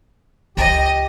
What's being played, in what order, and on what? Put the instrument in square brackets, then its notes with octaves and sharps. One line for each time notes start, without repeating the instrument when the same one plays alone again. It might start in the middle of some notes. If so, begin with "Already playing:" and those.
[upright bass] C#2 [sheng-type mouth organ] G4 [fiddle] D#5